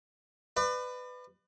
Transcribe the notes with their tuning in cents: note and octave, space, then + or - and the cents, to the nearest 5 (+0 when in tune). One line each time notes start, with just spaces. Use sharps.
B4 +20 D5 +40